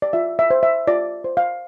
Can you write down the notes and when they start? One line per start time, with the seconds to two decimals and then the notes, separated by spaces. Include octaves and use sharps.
0.02 D5
0.13 F4 E5
0.39 E5
0.50 C5
0.63 E5
0.88 F4 D5
1.24 C5
1.37 F5